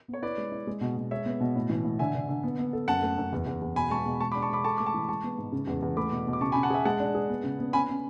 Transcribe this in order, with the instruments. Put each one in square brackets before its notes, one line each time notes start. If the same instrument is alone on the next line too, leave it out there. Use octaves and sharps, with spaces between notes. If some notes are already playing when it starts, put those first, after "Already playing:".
[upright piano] B3
[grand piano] C#5
[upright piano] E4 [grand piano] B4 D5
[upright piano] G#3
E4
G#3
B2
B2
[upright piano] G#3 [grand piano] C#5 E5
[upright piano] B3
B2
A2
E3
A2
[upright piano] D3 [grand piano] E5 G#5
[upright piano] D3
D3
B3
B3
A4
[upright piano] F#2 [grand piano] F#5 A5
[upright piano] A3
F#2
E2
E2
E2
[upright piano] B2 [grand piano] G#5 B5
[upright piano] G#3 [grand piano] A5 C#6
[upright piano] B2
[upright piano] G#3 [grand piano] A5 C#6
[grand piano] B5 D6
[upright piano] D4
[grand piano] A5 C#6
[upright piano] G#3 [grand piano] B5 D6
[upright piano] A4 [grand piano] A5 C#6
[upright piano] A3 [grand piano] D6
[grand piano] A5 C#6
[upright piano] E3
[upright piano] G#3 [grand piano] A5 C#6
[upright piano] B3
G#2
C#3
E2
E2
[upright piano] A3 [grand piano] B5 D6
[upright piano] B2
B2
[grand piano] D6
[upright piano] C#3 [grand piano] A5 C#6
[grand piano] G#5 B5
[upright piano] C#3
[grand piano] F#5 A5
[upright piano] G#4 [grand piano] E5 G#5
[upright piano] G#3 [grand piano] F#5 A5
[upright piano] D4
G#4
B3
C#3
B3
[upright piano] C#4 [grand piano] G#5 B5
[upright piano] C#4